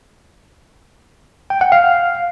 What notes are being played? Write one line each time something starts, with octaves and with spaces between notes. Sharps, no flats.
G5
F#5
F5